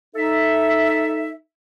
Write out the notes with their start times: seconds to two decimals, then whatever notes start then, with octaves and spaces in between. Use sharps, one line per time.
0.16 D#4 A4 E5